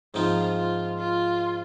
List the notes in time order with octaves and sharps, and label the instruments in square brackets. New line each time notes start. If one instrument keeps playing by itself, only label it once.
[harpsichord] G#2 F3 C4 D#4 [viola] F4
[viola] F4
F4